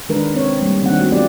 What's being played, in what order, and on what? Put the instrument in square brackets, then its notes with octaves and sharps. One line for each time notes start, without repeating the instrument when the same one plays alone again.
[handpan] D#3 G#3 D4 A#4 B4
C4 C#5
G3 A#3
D#3 A#3 C4 D4 F#5
A3 B3 F#4
F#3 B3 C4 F4 G4 D5